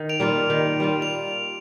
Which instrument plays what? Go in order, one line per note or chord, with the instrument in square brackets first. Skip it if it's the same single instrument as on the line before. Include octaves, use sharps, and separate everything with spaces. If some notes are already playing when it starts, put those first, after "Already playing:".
Already playing: [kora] D#3
[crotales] D7 F7
[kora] G3 A#3 F4
D#3
G3 A#3 F4
[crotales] F7